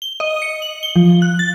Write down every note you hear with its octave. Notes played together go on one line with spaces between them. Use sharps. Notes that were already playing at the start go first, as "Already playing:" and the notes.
G7
D#5
C#7
F#7
G7
F3
F#6
A6